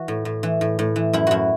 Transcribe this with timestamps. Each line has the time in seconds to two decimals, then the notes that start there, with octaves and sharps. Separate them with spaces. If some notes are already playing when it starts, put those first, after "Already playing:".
Already playing: E3 F#4
0.08 A2
0.25 A2
0.43 E3
0.61 A2
0.79 A2
0.96 E3
1.13 F#2 E4
1.27 F#2 E4 F#4